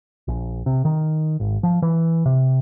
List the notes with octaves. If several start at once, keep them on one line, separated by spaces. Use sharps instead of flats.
A#1
C3
D#3
G#1
F3
E3
C3